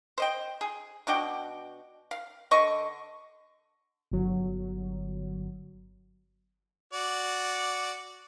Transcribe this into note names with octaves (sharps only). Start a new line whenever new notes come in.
C5 D#5 G5
G#4
B2 D4 F#4 G5
F5
D3 D#5 C#6
G1 F#3
F#4 D5